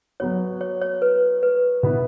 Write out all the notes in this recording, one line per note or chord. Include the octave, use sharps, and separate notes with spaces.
F#3 B3 F#4 C#5
C#5
C#5
B4
B4
B2 B3 E4